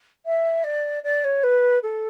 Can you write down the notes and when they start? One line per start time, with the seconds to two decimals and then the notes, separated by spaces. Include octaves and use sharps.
0.25 E5
0.64 D5
1.03 D5
1.24 C#5
1.43 B4
1.83 A4